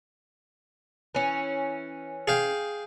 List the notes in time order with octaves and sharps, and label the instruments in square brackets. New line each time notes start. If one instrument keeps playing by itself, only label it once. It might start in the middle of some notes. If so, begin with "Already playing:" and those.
[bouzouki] E3 C#4
[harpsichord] G#4 F5 G5